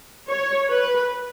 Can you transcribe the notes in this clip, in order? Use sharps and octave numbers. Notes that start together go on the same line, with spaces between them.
C#5
B4